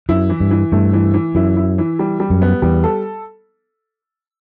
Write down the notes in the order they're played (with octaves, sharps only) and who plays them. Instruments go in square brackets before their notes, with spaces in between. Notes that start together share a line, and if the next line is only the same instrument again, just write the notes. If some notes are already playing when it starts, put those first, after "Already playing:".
[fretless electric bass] F#2 [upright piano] E4
[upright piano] E3
[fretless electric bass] G2
[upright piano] E3
[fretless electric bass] G2 [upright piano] A3
[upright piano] E3
E3
[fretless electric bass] F#2 [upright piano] E4
[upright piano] E4
E3
G3
G3
[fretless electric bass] F#2
[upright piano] B3
[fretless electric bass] E2 [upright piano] G3
[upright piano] A4